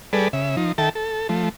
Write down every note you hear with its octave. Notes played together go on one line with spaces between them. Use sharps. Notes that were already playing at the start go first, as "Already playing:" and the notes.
G3 G#4 A4 B4 D5
C#3 E5
F3 D#4
D#3 A4 E5 G5 A5
A4
F3 A3